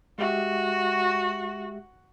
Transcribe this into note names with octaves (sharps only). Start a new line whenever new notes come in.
G#3 F#4 G4 E5